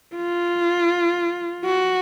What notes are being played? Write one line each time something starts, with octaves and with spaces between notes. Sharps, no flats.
F4
F#4